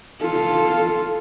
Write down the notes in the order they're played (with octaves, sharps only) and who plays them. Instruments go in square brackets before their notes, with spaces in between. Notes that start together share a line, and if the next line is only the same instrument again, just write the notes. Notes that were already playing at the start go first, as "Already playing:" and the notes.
[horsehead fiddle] F4 A4